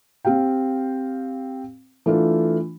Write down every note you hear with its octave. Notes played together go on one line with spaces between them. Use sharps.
C4 G4 F5 G5
E3 A3 D4 F4